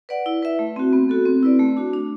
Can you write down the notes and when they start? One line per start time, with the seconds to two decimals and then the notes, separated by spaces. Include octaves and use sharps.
0.09 B4 D5 F#5
0.26 E4
0.43 B4 E5
0.59 A3
0.76 C4 F#4
0.93 B3
1.09 F#4 A4
1.26 C4
1.43 E4 B4 D5
1.59 A3
1.77 D4 F#4
1.94 D4